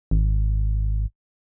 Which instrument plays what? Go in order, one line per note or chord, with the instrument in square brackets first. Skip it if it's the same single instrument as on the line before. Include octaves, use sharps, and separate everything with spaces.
[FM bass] G#1